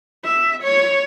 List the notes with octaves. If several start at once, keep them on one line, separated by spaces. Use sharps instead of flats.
E5
C#5